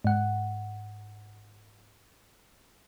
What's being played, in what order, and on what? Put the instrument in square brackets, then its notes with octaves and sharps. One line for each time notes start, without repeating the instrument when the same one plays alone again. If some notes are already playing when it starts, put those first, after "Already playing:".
[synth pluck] G#2 F#5